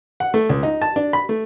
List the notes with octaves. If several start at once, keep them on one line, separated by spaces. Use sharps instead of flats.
F#5
A3
C#2
D#4
A5
D4
B5
A3